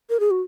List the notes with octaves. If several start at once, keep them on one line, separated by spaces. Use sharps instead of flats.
A#4
G#4
F#4